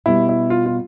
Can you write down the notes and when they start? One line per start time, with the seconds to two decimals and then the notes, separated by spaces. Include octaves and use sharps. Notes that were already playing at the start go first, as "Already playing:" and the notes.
0.06 B2 G3 B3 E4
0.29 E4
0.50 F4
0.66 F4